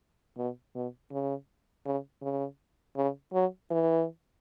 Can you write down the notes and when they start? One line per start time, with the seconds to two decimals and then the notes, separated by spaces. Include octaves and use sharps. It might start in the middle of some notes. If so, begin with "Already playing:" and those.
0.37 B2
0.75 B2
1.11 C#3
1.86 C#3
2.22 C#3
2.97 C#3
3.33 F#3
3.71 E3